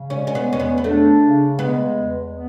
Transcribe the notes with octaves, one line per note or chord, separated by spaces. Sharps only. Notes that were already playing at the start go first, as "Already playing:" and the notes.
Already playing: C#3
G#3 C#4
C#4
B3
E2
C#4
B3
B3
A3 D4
C#3
G#3 B3
E2
B3